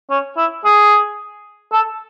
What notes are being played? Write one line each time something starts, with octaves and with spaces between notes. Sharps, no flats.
C#4
E4
G#4
A4